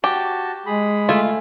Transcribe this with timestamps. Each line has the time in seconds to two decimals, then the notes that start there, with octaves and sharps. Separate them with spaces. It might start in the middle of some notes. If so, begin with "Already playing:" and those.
0.04 F#4 G4 A5
0.66 G#3 G#4 B5
1.09 A3 F4 G#5